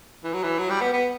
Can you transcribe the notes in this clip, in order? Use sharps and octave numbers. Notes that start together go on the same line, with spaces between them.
E3
F#3
E3
F#3
G3
B3
B3